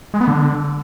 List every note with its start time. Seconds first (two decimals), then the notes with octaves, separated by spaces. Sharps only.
0.14 G#3
0.21 B3
0.28 D3